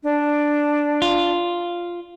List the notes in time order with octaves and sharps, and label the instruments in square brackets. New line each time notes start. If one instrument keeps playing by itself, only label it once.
[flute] D4
[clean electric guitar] F4